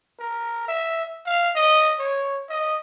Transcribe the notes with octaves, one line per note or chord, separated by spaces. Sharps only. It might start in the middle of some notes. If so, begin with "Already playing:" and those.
A#4
E5
F5
D#5
C#5
D#5